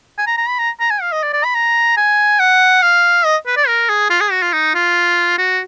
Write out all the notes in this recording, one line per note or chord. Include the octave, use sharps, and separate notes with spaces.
G#5
A#5
A#5
B5
A#5
A#5
G#5
F5
D#5
D5
D5
B5
A#5
G#5
F#5
F5
D#5
B4
D5
A#4
G#4
F4
G#4
F#4
F4
D#4
F4
F#4